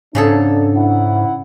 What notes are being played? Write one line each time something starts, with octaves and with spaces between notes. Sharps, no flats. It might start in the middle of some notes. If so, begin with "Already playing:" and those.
G#2 C#3 D4 G#4 A4
E4 F#5